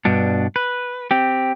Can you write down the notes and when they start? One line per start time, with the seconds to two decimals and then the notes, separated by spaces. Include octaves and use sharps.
0.05 G2 B2 D4
0.56 B4
1.11 C4 G4